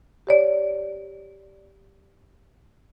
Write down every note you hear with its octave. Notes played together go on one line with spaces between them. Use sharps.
G4 C#5 D5